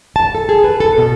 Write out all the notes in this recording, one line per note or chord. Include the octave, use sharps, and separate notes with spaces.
A5
A4
G#4
B4
A4
B2